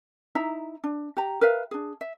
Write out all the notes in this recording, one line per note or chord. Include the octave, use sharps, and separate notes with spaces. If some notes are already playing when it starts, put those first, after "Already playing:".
D#4 E4 E5 A#5
D4
G4 A#5
A#4 B4 E5 F5
D4 G#4
E5